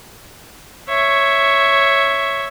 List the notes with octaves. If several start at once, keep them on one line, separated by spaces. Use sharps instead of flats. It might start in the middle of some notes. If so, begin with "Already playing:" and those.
C#5 E5